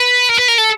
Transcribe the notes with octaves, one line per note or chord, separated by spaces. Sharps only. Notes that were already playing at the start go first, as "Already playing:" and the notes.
Already playing: B4
A#4
B4
A#4
A4